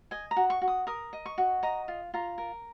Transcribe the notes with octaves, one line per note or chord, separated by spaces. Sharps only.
D#5 G#5
A#5
F#4
C#6
F#4
D#6
A#4 D#6
D#5
C#6
F#4
D#5 A#5
F4
F4 A#5
A#4